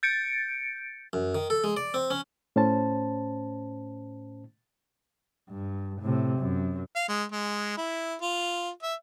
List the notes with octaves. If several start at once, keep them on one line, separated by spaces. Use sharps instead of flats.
G6 A6 C#7 D7
F#2
D#3
A4
G#3
D5
C4
C#4
A2 C#4 C5 A5
G2
A2 C3
F#2
F5
G#3
G#3
E4
F4
E5